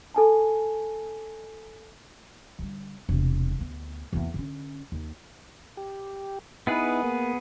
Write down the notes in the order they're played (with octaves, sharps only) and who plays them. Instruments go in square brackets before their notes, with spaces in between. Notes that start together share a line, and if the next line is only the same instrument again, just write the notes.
[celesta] A4 G#5 A5
[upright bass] D3 G3
E1 C3
D2 B3
E2 A#3
D3 C#4
D#2
[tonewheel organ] G4
[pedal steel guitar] B3 G#4 B4 [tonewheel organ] D#4 E4
[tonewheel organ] A#3